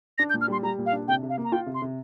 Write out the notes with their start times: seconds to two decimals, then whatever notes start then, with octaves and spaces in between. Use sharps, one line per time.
0.18 D4 A#6
0.30 G6
0.34 A#2
0.41 F6
0.48 G3 C6
0.63 G3 A#5
0.78 A#2
0.86 F5
0.92 D4
1.08 C3 G5
1.23 C3
1.29 F5
1.38 A#3
1.44 A#5
1.52 F4 G5
1.66 C3
1.74 C6
1.82 C3